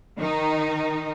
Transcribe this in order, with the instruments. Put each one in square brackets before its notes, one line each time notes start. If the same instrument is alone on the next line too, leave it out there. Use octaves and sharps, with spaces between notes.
[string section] D#3 D#4